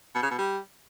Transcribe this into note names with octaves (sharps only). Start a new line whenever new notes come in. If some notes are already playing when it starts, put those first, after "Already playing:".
B2
C#3
B2
G3